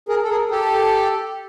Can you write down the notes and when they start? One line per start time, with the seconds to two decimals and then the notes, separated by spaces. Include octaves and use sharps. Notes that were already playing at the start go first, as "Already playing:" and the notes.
0.09 G#4 A#4
0.23 A4
0.30 G#4 A#4
0.51 G4 A4